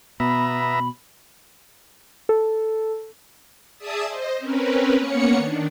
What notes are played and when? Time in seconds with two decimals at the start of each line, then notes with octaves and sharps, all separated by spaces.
0.20 B2 B3 E5 A#5 B5
2.29 A4
3.77 G#4 D5 E5 A5 D#6 E6
4.07 C5 D#5
4.37 C4 C#4 A#4 B4
4.98 A#3 B3 C#4 C#5 F#5 C#7
5.36 D#3 D4